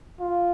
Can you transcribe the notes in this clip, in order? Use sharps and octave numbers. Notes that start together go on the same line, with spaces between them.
F4